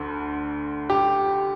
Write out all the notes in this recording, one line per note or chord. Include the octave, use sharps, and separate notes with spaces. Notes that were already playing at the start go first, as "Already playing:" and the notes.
Already playing: D2 D3
G4